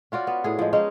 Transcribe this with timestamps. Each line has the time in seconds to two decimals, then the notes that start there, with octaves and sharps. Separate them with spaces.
0.12 C#4 F4 F#4 D5
0.27 B3
0.44 A2 G#4
0.59 F3 G#3
0.73 G#3 C#4 D#4